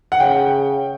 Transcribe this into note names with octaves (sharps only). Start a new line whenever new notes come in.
F#5
C#3 G5